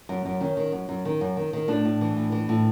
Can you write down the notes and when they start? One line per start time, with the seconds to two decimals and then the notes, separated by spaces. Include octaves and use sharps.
0.09 F#2
0.25 F#2
0.41 D#3 C#4
0.57 D#3
0.72 F#2
0.89 F#2
1.05 D#3
1.21 F#2
1.37 D#3
1.53 D#3
1.68 A2 D4
1.85 A2
2.01 E3
2.16 A2
2.32 E3
2.49 A2